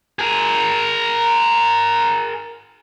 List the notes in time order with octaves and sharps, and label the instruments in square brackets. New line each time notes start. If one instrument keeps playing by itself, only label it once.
[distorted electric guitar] G#4 A#4